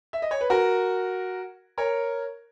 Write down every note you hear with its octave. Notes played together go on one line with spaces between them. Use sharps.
E5
D#5
C#5
B4
F#4 A#4
A#4 C#5